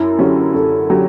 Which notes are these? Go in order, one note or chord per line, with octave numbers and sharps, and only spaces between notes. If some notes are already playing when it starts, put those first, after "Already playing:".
Already playing: F#2 E4
D3 F#3 C#4 G4
F#2 A4
D3 F#3 C#4 G4